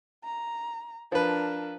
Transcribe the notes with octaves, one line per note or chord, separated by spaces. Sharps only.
A#5
F3 D4 A#4 B4